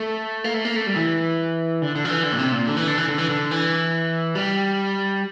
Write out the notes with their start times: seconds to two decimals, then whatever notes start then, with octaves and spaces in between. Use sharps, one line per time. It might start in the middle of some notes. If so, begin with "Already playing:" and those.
Already playing: A3
0.44 A#3
0.54 A3
0.65 A#3
0.76 A3
0.87 G3
0.96 E3
1.82 D3
1.96 D3
2.05 F3
2.10 E3
2.23 D3
2.32 A#2
2.38 C3
2.52 A#2
2.67 D3
2.77 E3
2.87 D3
2.97 E3
3.08 D3
3.18 E3
3.29 D3
3.51 E3
4.35 G3